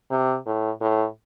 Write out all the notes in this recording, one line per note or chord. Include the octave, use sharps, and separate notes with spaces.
C3
A2
A2